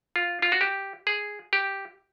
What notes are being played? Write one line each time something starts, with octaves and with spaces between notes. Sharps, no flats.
F4
F4
F#4
G4
G#4
G4